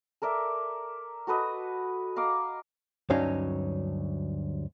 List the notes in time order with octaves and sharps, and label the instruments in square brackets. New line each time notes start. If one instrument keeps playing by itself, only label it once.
[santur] A4 A#4 D5 E5
F#4 A4 B4 D#5
D#5 F5 A#5 D6
[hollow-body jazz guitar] D2 G2 F#3 C#4 D#4 F5